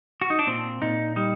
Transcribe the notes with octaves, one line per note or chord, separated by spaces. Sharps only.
F#4
D#4
D4
A#2 C4
A#2 D#4
G3 D#4